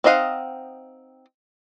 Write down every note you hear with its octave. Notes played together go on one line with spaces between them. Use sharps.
C4 D#4 D#5 F5 F#5